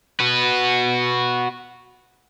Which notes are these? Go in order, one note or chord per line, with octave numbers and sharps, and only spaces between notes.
F#4 B4